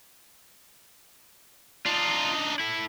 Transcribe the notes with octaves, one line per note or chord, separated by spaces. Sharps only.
D4 D#4 F4
E4 A4